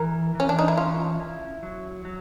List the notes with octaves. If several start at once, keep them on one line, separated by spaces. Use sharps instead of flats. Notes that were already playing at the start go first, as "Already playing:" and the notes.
Already playing: E3 A#4
E3 C#4
D4
D#4
E4
C#4 F4
E4
F#3
F#3